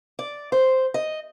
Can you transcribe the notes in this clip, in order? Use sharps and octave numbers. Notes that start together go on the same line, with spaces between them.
D5
C5
D#5